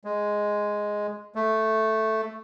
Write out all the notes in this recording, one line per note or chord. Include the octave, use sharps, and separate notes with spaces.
G#3
A3